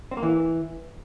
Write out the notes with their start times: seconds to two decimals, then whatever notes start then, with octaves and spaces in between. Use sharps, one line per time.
0.11 C4
0.17 A#3
0.23 E3